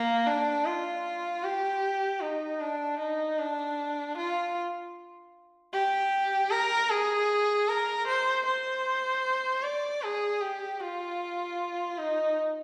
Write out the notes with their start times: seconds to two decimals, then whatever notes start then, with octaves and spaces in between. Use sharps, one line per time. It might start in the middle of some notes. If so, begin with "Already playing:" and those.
Already playing: A#3
0.27 D4
0.65 F4
1.43 G4
2.21 D#4
2.61 D4
2.99 D#4
3.38 D4
4.17 F4
5.73 G4
6.50 A#4
6.89 G#4
7.68 A#4
8.07 C5
8.46 C5
9.63 D5
10.02 G#4
10.41 G4
10.81 F4
11.98 D#4